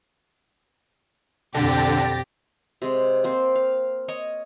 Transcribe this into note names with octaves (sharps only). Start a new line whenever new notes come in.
B1 F2 D3 G4 G5 A6 A#6
C3 G#3
A#3 C4 C5
F5
C#5 D#5 C#6